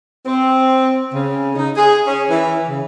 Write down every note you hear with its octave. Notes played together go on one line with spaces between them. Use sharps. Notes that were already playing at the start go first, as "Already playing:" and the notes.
C4
C#3
D#4
G#4
C#4
E3
C#3